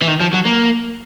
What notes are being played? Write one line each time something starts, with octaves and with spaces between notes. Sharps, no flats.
E3
D#3
F3
F#3
A#3